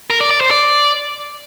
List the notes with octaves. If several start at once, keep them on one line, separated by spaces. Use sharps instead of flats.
A#4
D5
D5
C5
D5